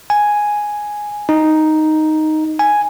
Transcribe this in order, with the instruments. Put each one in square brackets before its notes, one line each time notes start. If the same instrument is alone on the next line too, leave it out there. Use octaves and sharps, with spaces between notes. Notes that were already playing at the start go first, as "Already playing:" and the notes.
[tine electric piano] G#5
D#4
G#5